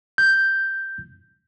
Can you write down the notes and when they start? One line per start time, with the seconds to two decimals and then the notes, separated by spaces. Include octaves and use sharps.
0.18 G6